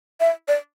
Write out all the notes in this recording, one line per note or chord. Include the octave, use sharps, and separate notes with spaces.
E5
D5